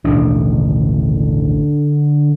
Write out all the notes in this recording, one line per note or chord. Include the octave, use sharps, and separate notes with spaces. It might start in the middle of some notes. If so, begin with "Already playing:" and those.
A1 D#2 B2 D3